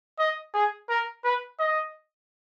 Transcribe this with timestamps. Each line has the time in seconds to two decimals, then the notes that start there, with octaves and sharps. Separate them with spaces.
0.19 D#5
0.54 G#4
0.89 A#4
1.24 B4
1.59 D#5